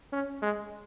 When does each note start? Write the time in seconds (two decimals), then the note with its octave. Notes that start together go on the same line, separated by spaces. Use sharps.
0.13 C#4
0.42 G#3